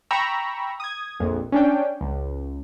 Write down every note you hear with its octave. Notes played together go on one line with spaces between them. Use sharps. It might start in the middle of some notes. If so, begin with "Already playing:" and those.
G5 A#5 B5 C#6 E6
D#6 G#6
A#1 F2
C#4 D4 G5
C#2